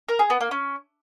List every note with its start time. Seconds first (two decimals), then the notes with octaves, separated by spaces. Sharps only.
0.09 A#4
0.19 G#4
0.30 B3
0.41 A#3
0.51 C#4